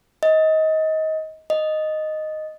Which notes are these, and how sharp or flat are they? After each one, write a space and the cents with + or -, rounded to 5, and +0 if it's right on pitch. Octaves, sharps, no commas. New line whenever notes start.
D#5 +25
D#5 -5